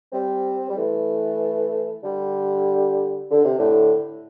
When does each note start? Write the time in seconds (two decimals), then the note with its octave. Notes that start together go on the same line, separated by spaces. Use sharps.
0.12 G3 C4
0.69 G3
0.76 E3 A3
2.03 D3 G3
3.31 D3
3.45 C3
3.59 A2 D3